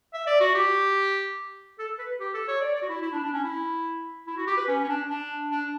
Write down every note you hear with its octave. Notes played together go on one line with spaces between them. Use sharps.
E5
D5
F#4
G4
A4
B4
G4
A4
C#5
D5
D5
F#4
E4
E4
D4
D4
C#4
E4
E4
F#4
G4
B4
C#4
C#4
D4
D4
D4